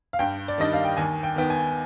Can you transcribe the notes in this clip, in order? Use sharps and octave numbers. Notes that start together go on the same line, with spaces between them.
F5
G2 G5
D5
D#3 G3 D4 D#5
F5
G5
D#2 G#5
G5
D#3 B3 G5
G#5